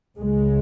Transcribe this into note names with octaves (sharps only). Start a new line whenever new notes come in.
C#2 C#3 G#3